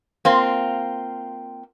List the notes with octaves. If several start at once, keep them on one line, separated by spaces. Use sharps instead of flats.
A#3 C4 F4